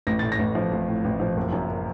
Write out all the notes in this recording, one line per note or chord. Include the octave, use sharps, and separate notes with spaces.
A1 A#6
A2 A6
A#6
A1
F3
A1
A2
A1
F3
F#1
F#2